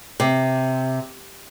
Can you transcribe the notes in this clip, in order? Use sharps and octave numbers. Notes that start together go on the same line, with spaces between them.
C3